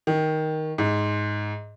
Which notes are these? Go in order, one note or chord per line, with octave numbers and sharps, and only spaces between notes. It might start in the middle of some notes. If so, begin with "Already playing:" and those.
D#3
G#2